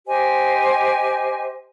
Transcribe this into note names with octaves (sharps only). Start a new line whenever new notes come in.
G4 C5 D#5 G#5